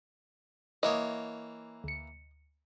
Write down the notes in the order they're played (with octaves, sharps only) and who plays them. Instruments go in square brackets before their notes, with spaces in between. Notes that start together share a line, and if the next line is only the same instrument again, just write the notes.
[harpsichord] E3 A#3 C#5 [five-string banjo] D#5
[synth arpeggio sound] D2 C#7